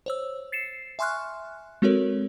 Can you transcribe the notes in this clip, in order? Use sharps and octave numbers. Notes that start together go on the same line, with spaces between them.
C5 C#5 E6
A6 C7 C#7 E7
E5 G#5 C6 C#6 F6 F#6
G#3 C4 F#4 A4 A#4 C#5